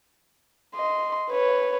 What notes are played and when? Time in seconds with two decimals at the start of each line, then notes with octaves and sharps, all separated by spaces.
0.75 D#5 C6
1.30 B4 C#5